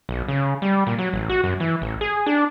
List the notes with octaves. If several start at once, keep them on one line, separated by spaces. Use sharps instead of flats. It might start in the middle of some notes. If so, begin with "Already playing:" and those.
B1
C#3
G3
A#2
F#3
A1
F#4
F#2
E3
A1
G#4
D4